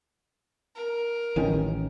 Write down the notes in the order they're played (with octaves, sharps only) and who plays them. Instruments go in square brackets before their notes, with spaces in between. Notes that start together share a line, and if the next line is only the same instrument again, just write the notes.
[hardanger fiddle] A#4
[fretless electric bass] A1 D#3 C#4